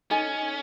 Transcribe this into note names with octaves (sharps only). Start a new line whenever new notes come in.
C#4 D#4 A4 D#5 G#5